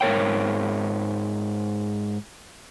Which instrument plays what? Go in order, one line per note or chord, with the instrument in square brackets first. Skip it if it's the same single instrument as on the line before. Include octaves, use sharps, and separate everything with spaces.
[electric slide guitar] G#2 A#4 C#5 G5